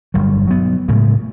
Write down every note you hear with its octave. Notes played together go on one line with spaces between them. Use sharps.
G1 G2 F#3
F#3 B3
A2 C#3 G#3